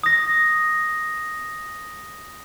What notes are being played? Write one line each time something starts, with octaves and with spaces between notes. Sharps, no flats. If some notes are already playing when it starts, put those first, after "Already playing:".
D#6 A#6